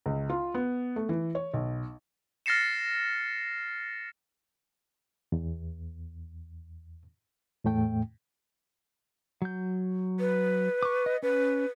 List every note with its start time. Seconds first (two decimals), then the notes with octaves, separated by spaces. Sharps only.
0.06 C#2
0.30 F4
0.54 B3
0.96 A3
1.09 E3
1.35 C#5
1.53 B1
2.46 F6 A6 A#6 C7 C#7 E7
5.32 E2
7.65 E2 A2 A3 G5
9.42 F#3 G6
10.20 B4
10.83 C#6 D6
11.06 D#5
11.23 C#4 B4